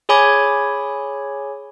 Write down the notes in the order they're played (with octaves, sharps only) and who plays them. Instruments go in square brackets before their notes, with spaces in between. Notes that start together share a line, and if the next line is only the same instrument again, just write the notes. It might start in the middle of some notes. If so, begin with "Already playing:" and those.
[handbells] G#4 C#5 G#5 B5 D6 G#6